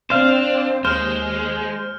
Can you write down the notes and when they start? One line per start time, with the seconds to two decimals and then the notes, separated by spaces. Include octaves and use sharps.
0.10 C4 D4 C5 F5
0.85 D#2 G#3 C5 F6